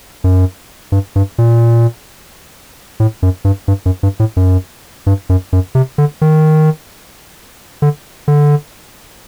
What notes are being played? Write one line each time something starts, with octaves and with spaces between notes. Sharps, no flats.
F#2
G2
G2
A#2
A2
F#2
G2
G2
F#2
G2
A2
F#2
G2
F#2
F#2
C3
D3
D#3
D3
D3